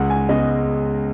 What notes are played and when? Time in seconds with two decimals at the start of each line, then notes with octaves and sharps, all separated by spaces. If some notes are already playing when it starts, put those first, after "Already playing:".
Already playing: C#2 F#5
0.10 G#5
0.29 C#3 G#3 B3 D#5